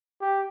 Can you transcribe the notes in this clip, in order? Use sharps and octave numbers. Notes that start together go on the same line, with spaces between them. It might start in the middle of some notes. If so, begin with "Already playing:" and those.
G4